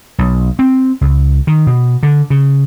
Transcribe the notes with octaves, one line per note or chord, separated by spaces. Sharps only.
B1
C4
C#2
D#3
B2
D3
C#3